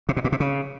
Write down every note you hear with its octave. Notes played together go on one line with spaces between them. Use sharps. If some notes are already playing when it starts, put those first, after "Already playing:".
C3
B2
A#2
C3
C#3